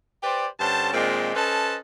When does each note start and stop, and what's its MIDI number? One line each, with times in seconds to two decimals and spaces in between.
0.23 0.47 67
0.23 0.47 71
0.23 0.47 72
0.23 0.47 74
0.60 0.91 43
0.60 0.91 50
0.60 0.91 61
0.60 0.91 72
0.60 0.91 81
0.93 1.34 46
0.93 1.34 51
0.93 1.34 56
0.93 1.34 60
0.93 1.34 62
0.93 1.34 65
1.35 1.77 61
1.35 1.77 69
1.35 1.77 71
1.35 1.77 72
1.35 1.77 75
1.35 1.77 81